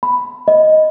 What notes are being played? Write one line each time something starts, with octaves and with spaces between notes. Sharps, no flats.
B5
D#5